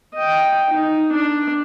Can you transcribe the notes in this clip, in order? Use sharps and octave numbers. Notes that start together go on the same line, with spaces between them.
D#5 G5
D#4
D4